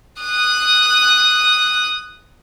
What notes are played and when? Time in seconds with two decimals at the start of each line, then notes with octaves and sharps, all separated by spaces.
0.22 D#6 F#6